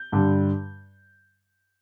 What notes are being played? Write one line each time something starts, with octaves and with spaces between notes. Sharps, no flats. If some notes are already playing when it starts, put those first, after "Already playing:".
Already playing: G6
G2 D3 G3